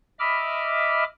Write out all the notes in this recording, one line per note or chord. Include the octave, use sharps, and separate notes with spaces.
D#5 E5 B5 D6 F6